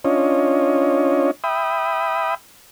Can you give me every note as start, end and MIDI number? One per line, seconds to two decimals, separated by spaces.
0.05 1.31 61
0.05 1.31 62
0.05 1.31 65
0.05 1.31 73
0.05 1.31 75
1.44 2.35 76
1.44 2.35 79
1.44 2.35 83
1.44 2.35 87